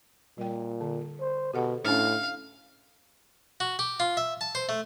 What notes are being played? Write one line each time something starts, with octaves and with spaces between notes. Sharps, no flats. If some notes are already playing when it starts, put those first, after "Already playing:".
A#2 G3 G5
D3
C5
B2 G4 A4 F#5
A2 C#4 D4 F5
F#4
G4
F4
E5
A5
C5
A3